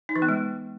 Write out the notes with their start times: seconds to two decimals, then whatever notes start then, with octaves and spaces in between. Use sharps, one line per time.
0.09 D#4
0.16 E3
0.22 B3
0.29 G#3